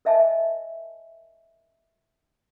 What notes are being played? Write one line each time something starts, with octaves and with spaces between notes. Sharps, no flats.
A#4 D#5 E5 G#5 A5